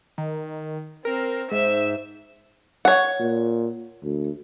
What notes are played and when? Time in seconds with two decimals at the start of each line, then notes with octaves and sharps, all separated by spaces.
0.18 D#3
1.05 C4 A#4
1.51 G#2 C5 E5
2.85 C#5 F#5
3.20 A#2
4.03 D2